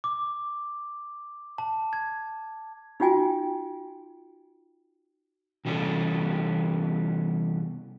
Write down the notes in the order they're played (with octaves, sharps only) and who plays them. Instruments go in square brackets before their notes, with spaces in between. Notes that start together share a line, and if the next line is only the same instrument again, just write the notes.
[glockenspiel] D6
A5
G#6
[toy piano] D#4 F4 F#4 G5 G#5
[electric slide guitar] C3 E3 G3 B3 C#4 A4